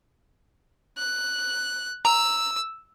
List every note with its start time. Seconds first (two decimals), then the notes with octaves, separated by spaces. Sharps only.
0.98 F#6
2.05 A#5 E6